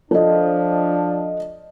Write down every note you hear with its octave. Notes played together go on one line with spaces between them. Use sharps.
F3 D4 A4 D#5